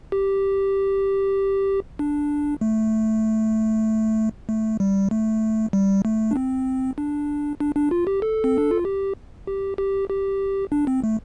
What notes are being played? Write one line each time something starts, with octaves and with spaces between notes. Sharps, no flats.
G4
D4
A3
A3
G3
A3
G3
A3
D4
C4
D4
D4
D4
F4
G4
A4
C4
D4
F4
G4
G4
G4
G4
D4
C4
A3